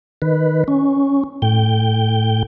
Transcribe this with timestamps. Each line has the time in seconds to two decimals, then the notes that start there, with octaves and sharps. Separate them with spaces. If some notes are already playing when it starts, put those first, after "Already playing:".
0.22 D#3 B4
0.68 C#4
1.42 A2 G5